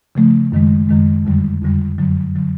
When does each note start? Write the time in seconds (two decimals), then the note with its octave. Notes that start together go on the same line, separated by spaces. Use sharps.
0.15 C#3 F3 A3
0.52 F#2 D#3 G#3
0.89 F#2 D#3 G#3
1.25 F2 D3 G3
1.62 F2 D3 G3
1.98 F#2 D3 F#3
2.35 D3 F#3